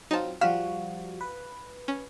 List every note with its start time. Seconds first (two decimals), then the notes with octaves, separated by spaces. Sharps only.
0.11 F#3 C4 D#4 F4 A5
0.41 F3 G3 F#4 F5 F6 B6 E7
1.21 B4
1.88 C#4